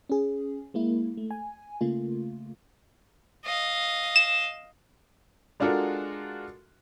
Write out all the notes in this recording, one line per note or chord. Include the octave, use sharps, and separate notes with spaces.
C#4 G#4
G#3 A#3 E4
A3
G#5
C#3 A3 A#3 F4
D#5 F5
E7
G#3 D4 F4 F#4 A4 A#4